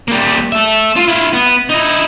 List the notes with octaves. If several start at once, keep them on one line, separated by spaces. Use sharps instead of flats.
G3 A#3
A4 E5
F4
E4 F5
B3
D#4 E4